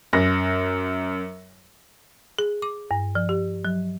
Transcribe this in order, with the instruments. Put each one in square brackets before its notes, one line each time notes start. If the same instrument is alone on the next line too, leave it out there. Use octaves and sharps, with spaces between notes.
[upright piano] F#2 A#6
[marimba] G#4
D6
G2
F3
G4
F#3